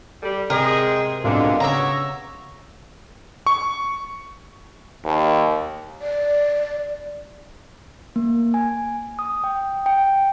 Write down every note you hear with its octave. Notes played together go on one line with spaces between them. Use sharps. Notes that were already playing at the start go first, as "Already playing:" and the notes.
G3 A4
C3 G#3 G#4 A#4 C5 G5
C2 B2 D3 G#3 A#3 D4 F4
C#3 B3 C#5 E5 A#5 D6
C#6
D#2
D5
A#3
G#5
D#6
G5
G5